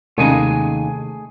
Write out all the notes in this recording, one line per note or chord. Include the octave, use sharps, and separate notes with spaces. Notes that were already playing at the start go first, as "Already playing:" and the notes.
D#2 C3 G#3 A3 C#4 D#4 G#4 G#5